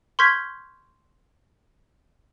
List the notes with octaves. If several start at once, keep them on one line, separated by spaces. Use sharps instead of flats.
C6 C#6 F6 G6 G#6 B6